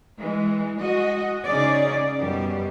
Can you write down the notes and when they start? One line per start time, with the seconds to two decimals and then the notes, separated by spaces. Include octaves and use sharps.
0.20 E3 G#3
0.80 G#3 F#4 D#5
1.46 C#3 C#4 D#4 G#4 D5
2.19 F#2 B2 G3 G4